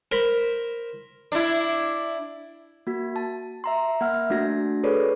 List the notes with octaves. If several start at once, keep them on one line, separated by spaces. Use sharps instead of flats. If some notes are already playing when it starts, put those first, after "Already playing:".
A#4 C5 B5
D4 E4
A#3 F#4
A5
E5 A#5 C6
A#3 E5 F#5 F6
A3 D4 F#4 A#6
G#4 A4 B4 C#5 D5